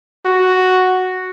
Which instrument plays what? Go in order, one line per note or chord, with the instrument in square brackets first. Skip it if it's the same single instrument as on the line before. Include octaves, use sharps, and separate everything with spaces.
[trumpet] F#4